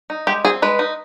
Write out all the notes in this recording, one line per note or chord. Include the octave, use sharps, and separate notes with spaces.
D#4
G#3 G4
C4 G#4
G#3 B4
D#4